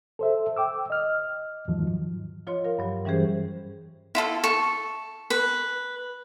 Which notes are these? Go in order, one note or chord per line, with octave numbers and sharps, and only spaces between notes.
A4 C5 E5
G5 D6 E6
D#5 F6
E2 G#2 D#3 F3 F#3
F3 F4 C#5 D#5 C6
A#4 F5
G2 F#3
E3 G3 C#4 G4 G#4 C5
E4 F4 A4
A4 C#6
B4